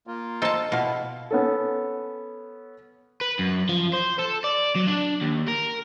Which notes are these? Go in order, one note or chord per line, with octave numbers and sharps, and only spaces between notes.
A#3 F4
A4 C5 D#5 A5 A#5 C6
B2 F3 E4 F5
B3 C#4 A4
B4
F#2
F3
C5
A4
D5
F#3
D4
D#2
A#4